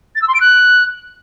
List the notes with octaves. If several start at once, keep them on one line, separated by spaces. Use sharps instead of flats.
A6
E6
C6
D7
F#6